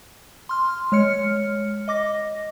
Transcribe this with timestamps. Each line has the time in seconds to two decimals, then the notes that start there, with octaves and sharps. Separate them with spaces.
0.49 C6 F6
0.92 G#3 C#5 F6 C#7
1.88 D#5 D6 A#6